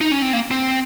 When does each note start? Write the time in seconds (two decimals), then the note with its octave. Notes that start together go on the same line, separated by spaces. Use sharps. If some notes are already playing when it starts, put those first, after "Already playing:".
0.01 D#4
0.11 C#4
0.22 C4
0.33 A#3
0.51 C4